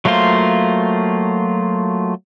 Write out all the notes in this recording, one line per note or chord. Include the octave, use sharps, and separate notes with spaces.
F#3 A3 A#3 F4 C5